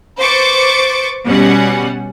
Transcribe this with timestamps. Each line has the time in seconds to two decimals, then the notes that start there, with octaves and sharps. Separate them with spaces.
0.20 B4 C5 C#6 D6 A6
1.26 B2 G3 C#4 F#5